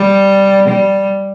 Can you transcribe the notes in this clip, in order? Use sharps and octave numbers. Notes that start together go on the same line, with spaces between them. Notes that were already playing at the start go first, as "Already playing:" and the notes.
Already playing: G3
G3